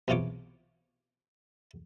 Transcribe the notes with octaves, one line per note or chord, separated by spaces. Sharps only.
B1 E2 C3 F4 C#5 D6